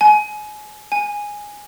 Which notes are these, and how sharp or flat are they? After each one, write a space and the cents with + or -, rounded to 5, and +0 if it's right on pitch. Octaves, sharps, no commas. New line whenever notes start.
G#5 +25
G#5 -5